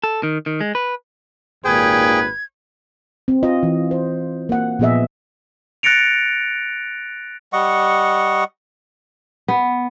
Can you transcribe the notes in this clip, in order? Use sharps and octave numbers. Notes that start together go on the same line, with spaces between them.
A4
D#3
D#3
G#3
B4
G#1 D#2 A#2 G#4 B4 G5 G#6
C4
F4 D#5
E3
C5
A#3 F#5
A#2 F3 B3 G#4 D#5 E5
F#6 A6 A#6 C#7 D7 F7
G3 D#5 F#5 C#6
B3